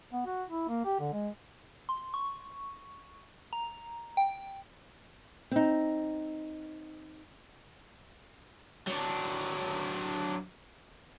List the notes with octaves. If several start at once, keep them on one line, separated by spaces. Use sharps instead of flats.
B3
F#4
E4
A#3
G4
D3
G#3
C6
C#6
A#5
G5
C4 D#4
F#3 D4